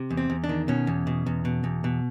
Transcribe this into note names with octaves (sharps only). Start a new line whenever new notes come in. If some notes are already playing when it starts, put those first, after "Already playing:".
Already playing: C3
E2
C4
E2
D4
D#3
B2 C#4
E2
B2
E2
B2
E2
B2